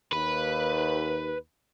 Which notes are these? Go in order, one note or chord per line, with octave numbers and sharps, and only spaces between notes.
D#2 B4